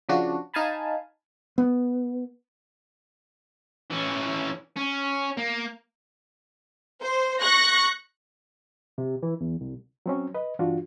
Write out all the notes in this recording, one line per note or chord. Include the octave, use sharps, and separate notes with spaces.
C#3 F3 D4 F#4
D#4 F5 G#5 A5 B5
B3
E3 C#4
C#4
A#3
C5
C#6 F#6 A#6
C3
E3
E2
C2
F#3 C4 C#4
B4 D#5
G2 E3 D4 F4 F#4